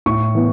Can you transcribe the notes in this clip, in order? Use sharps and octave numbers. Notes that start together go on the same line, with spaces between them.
A2 C#6
E3 B3